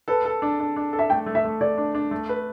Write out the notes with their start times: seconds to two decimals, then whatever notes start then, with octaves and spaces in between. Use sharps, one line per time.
0.08 A4 B4
0.25 A4
0.42 D4
0.60 D4
0.76 D4
0.93 A4
0.99 E5
1.10 A3 G5
1.26 A3
1.35 E5
1.45 A3
1.61 A4 D5
1.78 D4
1.95 D4
2.11 A3
2.29 B4